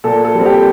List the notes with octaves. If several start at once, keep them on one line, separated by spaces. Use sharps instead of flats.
A#2 A4
A4
G3 C4
G4